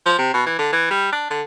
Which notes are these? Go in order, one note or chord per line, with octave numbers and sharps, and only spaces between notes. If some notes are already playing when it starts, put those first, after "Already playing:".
F3
C3
B2
E3
D3
E3
G3
D4
D3